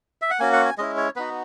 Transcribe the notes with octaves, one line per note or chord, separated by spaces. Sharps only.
E5
F#5
A#3 C#4 F#4 G#5
F#5
G#5
G#3 C#4 E4 D#5
C#5
B3 D#4 F#4 B4